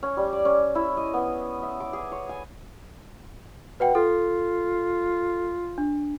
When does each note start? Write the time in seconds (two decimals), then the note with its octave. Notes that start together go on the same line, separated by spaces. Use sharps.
0.03 C#4
0.17 G3
0.33 D5
0.45 C#4
0.75 E4
0.97 D#5
1.14 B3
1.63 E5
1.80 D6
1.93 G#4
2.12 C#5
2.29 G#5
3.80 B2 B4 F#5 G5
3.95 F4 A4
5.78 D4